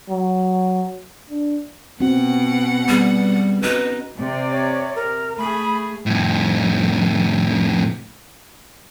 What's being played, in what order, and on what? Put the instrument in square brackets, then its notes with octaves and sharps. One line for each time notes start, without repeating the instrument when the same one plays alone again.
[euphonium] F#3
D4
[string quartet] B2 F#5 [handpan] C4 C#4 F#4
[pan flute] G3 [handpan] B3 G#4
[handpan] C#4 F#4 [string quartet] D#4 [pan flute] B4
[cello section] C3 D5
[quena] C#5
A#4
[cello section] A3 G#4 [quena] B5
[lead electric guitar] F2 A2